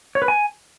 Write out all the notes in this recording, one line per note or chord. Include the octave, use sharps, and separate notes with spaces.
C#5
B4
G#5